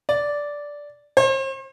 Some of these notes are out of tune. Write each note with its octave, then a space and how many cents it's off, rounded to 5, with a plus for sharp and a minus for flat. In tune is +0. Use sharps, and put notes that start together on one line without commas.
D5 -10
C5 +40